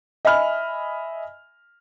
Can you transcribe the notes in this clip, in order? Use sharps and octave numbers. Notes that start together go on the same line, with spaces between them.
D#5 E5 G#5 B5 F6